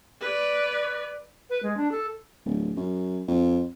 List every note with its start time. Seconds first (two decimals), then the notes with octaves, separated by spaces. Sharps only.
0.21 B4 D5
1.50 B4
1.63 G#3
1.77 D4
1.92 A4
2.45 D1
2.77 F#2
3.28 F2